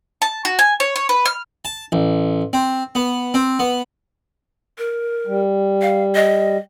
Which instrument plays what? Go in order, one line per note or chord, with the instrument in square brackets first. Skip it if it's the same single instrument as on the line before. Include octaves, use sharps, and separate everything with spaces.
[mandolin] A5
F#4
G#5
C#5
C#5
B4
F6
[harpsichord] A5
A1
C4
B3
C4
B3
[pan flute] A#4
[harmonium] G3
[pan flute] F5
D#5